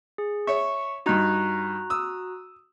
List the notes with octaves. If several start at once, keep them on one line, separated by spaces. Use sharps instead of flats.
G#4
C#5 E5 C#6
G2 D#4 F#4 A#5 F#6
D#6 E6